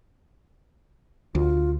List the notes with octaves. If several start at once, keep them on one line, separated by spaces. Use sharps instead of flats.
D2 F4